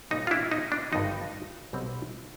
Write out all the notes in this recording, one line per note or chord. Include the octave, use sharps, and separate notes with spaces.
A#2 G3 A#3 C#4 D#4
F4
D4 E4
D#4
D4
G#1 G2 D3 F3 D#4
B1 B2 G3 C4